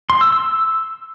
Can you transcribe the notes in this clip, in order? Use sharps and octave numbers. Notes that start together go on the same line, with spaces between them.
C6
E6
E6